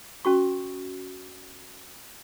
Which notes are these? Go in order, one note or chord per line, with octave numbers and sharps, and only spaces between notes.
C#4 F#4 C#6